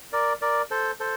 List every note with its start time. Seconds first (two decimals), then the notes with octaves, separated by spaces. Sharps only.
0.13 A#4 D5
0.41 A#4 D5
0.71 A4 C5
1.00 A4 C5